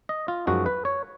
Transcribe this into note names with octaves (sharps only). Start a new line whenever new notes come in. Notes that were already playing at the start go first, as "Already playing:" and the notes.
D#5
F4
F#2 F3 G#3 D#4 F#4
B4
C#5